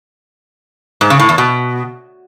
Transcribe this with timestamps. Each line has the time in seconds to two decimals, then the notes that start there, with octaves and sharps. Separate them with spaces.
1.01 G#2
1.10 C#3
1.19 A2
1.29 E2
1.38 B2